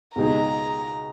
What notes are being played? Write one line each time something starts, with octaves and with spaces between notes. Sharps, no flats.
C#2 B2 G#3 D#4 G#4 A#5